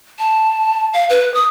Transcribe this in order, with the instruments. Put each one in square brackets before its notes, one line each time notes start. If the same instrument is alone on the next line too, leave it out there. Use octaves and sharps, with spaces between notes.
[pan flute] A5
F5
B4
D#6